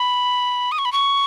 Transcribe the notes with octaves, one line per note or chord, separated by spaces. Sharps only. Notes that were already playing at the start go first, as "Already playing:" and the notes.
Already playing: B5
D#6
C#6
B5
C#6